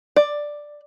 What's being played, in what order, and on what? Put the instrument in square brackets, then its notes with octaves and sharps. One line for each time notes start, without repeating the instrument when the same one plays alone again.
[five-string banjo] D5